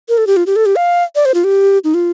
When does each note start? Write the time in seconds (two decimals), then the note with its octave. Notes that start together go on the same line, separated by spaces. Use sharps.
0.09 A#4
0.18 A4
0.27 G4
0.37 F4
0.46 G4
0.56 A4
0.66 G4
0.76 F5
1.15 D5
1.25 C5
1.34 F4
1.44 G4
1.84 D#4
1.94 F4